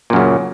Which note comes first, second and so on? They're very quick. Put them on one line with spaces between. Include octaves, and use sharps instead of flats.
A#2 F#2 C#3